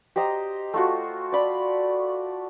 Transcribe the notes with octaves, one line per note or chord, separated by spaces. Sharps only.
G4 C5 D#5 A#5
A3 F4 F#4
D5 B5